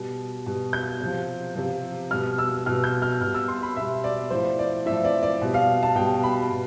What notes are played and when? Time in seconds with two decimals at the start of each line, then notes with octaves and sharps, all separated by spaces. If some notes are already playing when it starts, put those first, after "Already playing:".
Already playing: B2 G3
0.46 B2 G3
0.73 G6
1.00 C3 F3
1.55 C3 F3
2.11 B2 G3 F6
2.38 E6
2.66 B2 G3 F6
2.84 G6
3.02 F6
3.21 B2 F6
3.24 G3
3.35 E6
3.48 C6
3.63 B5
3.76 B2 E5
3.80 G3
4.04 D5
4.30 A2 F3 C5
4.59 D5
4.86 A2 E5
4.91 F3
5.05 D5
5.23 D5
5.42 B2 G3
5.54 F5
5.83 A5
5.95 B2 G3 G5
6.23 B5
6.51 B2